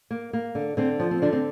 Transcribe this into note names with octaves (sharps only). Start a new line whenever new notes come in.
A#3
A#3
D3
D3 C4
F3
C4
D3 D4
C4